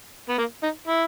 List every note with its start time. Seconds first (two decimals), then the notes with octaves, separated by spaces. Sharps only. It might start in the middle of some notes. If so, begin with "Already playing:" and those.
0.29 B3
0.38 A#3
0.63 D#4
0.88 E4